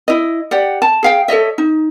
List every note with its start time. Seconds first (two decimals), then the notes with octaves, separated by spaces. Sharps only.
0.08 E4 D#5
0.51 G4 D5 F#5
0.82 A5
1.03 G#4 F5 G5
1.28 A4 C#5 D#5 E5
1.58 D#4